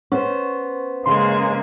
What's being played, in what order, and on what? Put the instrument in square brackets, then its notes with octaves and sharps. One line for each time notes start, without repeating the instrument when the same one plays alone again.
[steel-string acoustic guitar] B3 C5 [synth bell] C#4
[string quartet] C#3 G#3 A#3 [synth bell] C6